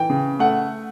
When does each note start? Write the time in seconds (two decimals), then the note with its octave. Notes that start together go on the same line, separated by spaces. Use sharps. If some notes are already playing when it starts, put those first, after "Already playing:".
Already playing: E3 G5
0.10 C#3
0.39 A3 F#5